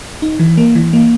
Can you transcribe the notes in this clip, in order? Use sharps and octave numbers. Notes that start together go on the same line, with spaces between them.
D#4
E3
A#3
E3
A#3